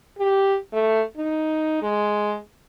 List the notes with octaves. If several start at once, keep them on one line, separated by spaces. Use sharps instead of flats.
G4
A3
D#4
G#3